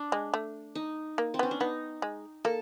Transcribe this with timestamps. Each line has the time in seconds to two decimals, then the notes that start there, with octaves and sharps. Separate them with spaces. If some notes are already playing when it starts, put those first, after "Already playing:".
Already playing: D4
0.12 G#3
0.34 A3
0.75 D#4
1.18 A#3
1.34 C4
1.39 B3 C#4
1.51 D4
1.60 B3 D#4
2.02 G#3
2.45 A#3 A4